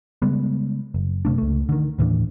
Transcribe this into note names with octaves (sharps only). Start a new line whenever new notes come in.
C#3 G3 G#3 B3
F#1
F#1 C3 A3 D4
C#2 A3
D3 D#3
D#2 A2 E3 D4